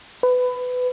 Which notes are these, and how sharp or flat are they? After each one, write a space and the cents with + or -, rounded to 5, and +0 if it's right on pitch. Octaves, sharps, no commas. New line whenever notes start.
B4 +20